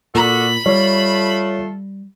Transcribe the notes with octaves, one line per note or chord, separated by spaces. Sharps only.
A#2 F#4 A4 D5 B5
G3 A3 F4 A4 C#5